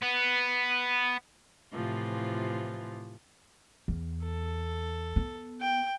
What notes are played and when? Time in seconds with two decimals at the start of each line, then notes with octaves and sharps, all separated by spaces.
0.02 B3 B4
1.72 A2 C3 E3 F3 F4
3.88 E2
4.24 A4
5.16 B3
5.60 G5